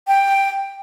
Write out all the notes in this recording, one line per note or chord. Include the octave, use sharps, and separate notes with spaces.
G5